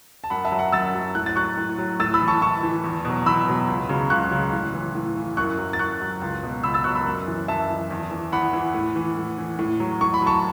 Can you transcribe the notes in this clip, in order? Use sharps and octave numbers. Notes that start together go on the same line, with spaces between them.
A5
F#2 F#5 B5
E5 A5
F#3
F#5
F#2 E6 A6
F#3
A2 F#6
A6
F#3 C#6 F#6
A2
F#3
A2 E6 A6
B5 E6
E3
A5 C#6
A2 A5 C#6
E3
E2
B2
F#3
E2 B5 E6
B2 F#3
C#2
C#3 F#3
C#2 C#6 F#6
C#3 F#3
A2
E3
A2
E3
F#2 C#6 F#6
F#3
A6
F#2 C#6 F#6
F#3
C#2
B2 F#3
C#2 B5 E6
E6 A6
B2 F#3 C#6 F#6
B5 E6
F#2
E3
F#2 E5 A5
E3
E2
E3
E2 F#5 B5
E3
A2
E3
A2
E3
A2
F#3
A2 C#6
B5
F#3 A5 C#6